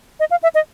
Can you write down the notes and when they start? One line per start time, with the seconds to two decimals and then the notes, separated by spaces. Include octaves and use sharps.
0.20 D#5
0.31 F5
0.43 E5
0.55 D#5